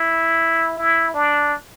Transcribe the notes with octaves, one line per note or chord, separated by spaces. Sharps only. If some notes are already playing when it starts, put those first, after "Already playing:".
Already playing: E4
E4
D4